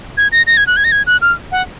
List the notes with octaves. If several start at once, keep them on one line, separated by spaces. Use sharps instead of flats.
G#6
A#6
A#6
G#6
F#6
G#6
A#6
G#6
F#6
F6
F#5